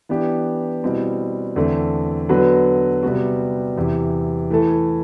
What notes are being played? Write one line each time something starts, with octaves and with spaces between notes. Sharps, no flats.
E3 B3 D4 G4
B2 G3 C4 E4
E2 D3 A3 C4
D3 F#3 B3 F#4 B4
C3 G3 B3 F#4
E2 C3 E3
E3 A3 E4 A4